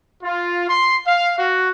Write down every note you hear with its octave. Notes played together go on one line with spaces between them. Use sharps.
F4
C6
F5
F#4